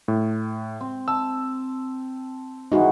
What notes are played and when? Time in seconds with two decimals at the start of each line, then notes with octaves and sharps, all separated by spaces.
0.08 A2
0.81 C4
1.08 A5 E6
2.72 G#2 D#3 E3 D#4 F#4